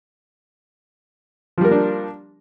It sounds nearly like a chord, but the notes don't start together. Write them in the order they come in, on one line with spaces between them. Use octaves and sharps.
F3 G3 A#4 A#3 D4